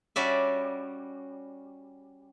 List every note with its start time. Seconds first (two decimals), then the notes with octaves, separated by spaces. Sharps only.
0.16 G3 C#4 F#4 D5 E5